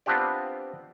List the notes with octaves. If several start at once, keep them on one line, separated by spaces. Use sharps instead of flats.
B3 C4 D4 F4 G4 D5